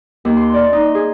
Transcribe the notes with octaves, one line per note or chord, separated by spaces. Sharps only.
D#2
C6
D5
D#4
G#4